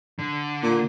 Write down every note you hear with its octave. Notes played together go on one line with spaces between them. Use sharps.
D3
A#2